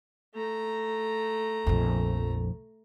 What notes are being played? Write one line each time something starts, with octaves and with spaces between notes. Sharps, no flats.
A3 A#5
A#1 F2